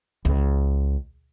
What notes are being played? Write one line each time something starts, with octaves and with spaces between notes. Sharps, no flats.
C#2